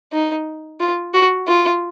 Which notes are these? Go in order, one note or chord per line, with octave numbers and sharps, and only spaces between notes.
D#4
F4
F#4
F4